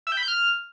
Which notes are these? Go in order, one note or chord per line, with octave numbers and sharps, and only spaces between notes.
E5
G5
B5
G6
F6